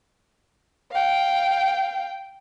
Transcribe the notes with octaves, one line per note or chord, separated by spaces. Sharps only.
F5 G5